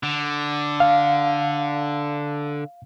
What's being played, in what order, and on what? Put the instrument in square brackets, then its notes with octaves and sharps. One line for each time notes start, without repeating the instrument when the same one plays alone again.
[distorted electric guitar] D3
[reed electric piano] F5